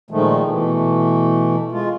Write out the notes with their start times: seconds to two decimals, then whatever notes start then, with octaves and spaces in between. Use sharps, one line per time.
0.11 A#2 D#3 F3 G#3 A3
0.48 B2 E3 A3
1.72 G#3 F4